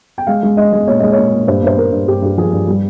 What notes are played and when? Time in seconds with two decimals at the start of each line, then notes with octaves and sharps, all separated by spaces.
0.18 G5
0.27 G#3 F5
0.43 G#3
0.57 G#3 D#5
0.73 G#3
0.88 A#2 C#5
0.99 G#3 D#5
1.12 A#2 C#5
1.33 A#2
1.47 G2 C5
1.63 G2 C5
1.78 G2 A#4
1.92 G2
2.07 G2 G4
2.22 G2 G4
2.37 F3 G#4
2.53 G2
2.68 G3